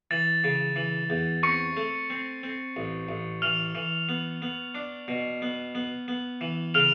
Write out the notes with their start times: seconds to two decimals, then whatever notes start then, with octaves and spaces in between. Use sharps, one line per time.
0.11 E3 A6
0.44 C#3
0.76 E3
1.10 E2
1.43 C4 C#6 C#7
1.77 A3
2.10 C4
2.43 C4
2.76 A1
3.08 A1
3.42 E3 F6 F7
3.75 E3
4.09 B3
4.42 B3
4.75 D4
5.08 B2
5.42 B3
5.75 B3
6.08 B3
6.41 E3
6.74 C#3 F6 F7